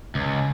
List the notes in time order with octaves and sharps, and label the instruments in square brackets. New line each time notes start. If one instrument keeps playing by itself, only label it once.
[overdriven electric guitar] C#2